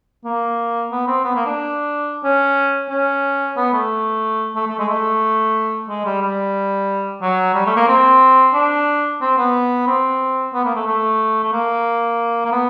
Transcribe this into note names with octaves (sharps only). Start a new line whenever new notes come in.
A#3
B3
C4
B3
A#3
D4
C#4
C#4
B3
A3
A3
A3
G#3
A3
G#3
G3
G3
F#3
G3
A3
A#3
C4
D4
C4
B3
C4
B3
A#3
A3
A3
A3
A#3
A#3
B3